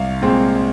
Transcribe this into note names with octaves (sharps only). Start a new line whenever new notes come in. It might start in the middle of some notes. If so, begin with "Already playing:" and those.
Already playing: C2 F5
A#2 G#3 C4